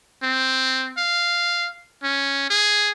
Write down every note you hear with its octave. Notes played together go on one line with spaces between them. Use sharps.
C4
F5
C#4
G#4